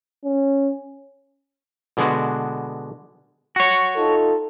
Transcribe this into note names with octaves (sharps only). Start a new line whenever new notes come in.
C#4
B2 D3 G#3 B3 F#4
F#4 C#5
D#4 F4 A4